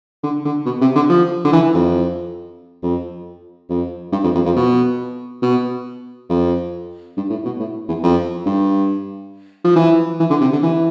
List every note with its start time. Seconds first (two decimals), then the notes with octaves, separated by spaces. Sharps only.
0.23 D3
0.45 D3
0.66 B2
0.81 C3
0.95 D3
1.10 F3
1.45 D3
1.53 E3
1.74 F2
2.83 F2
3.70 F2
4.12 G2
4.24 F2
4.35 F2
4.46 F2
4.56 B2
5.42 B2
6.29 F2
7.17 G2
7.30 A2
7.45 B2
7.60 A2
7.88 E2
8.03 F2
8.46 G2
9.64 F3
9.76 E3
10.20 E3
10.30 D3
10.41 C3
10.53 D3
10.63 E3